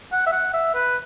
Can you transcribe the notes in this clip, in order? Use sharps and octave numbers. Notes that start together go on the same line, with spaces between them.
F#5
E5
F#5
E5
B4